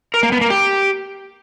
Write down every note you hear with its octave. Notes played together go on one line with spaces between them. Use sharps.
A#4
A#3
B3
A#3
G4